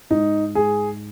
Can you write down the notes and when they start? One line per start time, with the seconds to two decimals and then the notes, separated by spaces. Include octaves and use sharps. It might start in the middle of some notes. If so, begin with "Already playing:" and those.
0.10 G#2 D#4
0.55 G#2 G#4